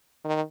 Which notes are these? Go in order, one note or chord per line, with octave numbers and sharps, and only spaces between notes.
D#3